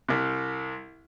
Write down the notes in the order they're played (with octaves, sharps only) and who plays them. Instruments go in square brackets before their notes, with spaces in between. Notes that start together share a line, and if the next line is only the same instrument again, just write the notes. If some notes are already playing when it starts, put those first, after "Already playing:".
[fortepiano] C2 C3